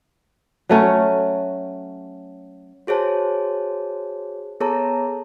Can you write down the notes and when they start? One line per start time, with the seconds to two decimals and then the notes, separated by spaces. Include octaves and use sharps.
0.69 F#3 A3 C#4
2.87 F#4 G#4 C5 C#5 A5
4.60 B3 G#4 A4 C#5 A5 A#5